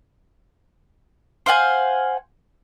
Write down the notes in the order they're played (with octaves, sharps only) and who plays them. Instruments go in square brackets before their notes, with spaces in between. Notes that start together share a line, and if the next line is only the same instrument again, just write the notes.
[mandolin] C5 F5 F#5 G#5